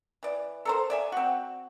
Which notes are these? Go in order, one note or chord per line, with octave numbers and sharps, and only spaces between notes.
E3 D5
A4 A#4 C5
D5 E5 G#5
C4 F#4